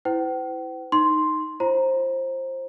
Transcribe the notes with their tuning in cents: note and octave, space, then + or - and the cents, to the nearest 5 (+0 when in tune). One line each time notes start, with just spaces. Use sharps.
E4 +0 C5 -45 G5 -45
D#4 -5 C6 +0
F4 -40 C5 +20 A#5 +0